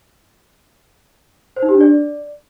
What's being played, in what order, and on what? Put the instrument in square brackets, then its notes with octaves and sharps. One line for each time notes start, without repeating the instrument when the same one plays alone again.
[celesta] C5
D#4
G4
D4
D5